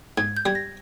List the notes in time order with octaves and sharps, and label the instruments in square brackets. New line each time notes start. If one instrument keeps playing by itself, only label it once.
[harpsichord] G#2 [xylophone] G#6
[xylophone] G6
[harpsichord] G3 [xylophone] G#6
[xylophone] A#6